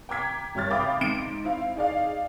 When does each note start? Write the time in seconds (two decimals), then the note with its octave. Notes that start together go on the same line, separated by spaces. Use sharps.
0.09 G5 A#5 D6 G#6 B6
0.55 G#1 G3 C#5 F6 A6
0.71 E5 F5 G5 B5 D6 D#6
1.01 G#2 D7
1.45 C4 E4 F5
1.76 D#4 G#4 D5 F5